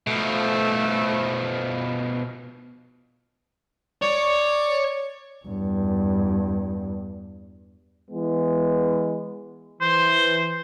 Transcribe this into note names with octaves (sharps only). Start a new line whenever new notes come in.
B2 F3 A3
C#5 D5
E2 G2
E3 G#3 B3
E3 C5